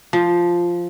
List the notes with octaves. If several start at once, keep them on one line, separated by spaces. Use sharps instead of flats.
F3